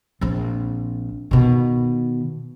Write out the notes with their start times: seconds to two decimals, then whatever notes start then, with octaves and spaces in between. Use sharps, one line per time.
0.21 A#1 C4
1.31 B2 D#3